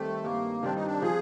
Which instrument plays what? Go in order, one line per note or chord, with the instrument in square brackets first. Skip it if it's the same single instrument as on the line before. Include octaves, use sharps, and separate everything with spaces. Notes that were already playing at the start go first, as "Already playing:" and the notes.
Already playing: [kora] D#3 G3 C4 [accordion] A3
[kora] G2 [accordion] A#3
[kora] D#3 G3 C4 [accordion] D4
[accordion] D#4
D4
[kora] F3 [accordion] G#4